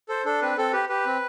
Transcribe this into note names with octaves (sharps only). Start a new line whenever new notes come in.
A4 C5
D4 A4
C4 B4
C4 A4
G4 B4
G4 B4
C4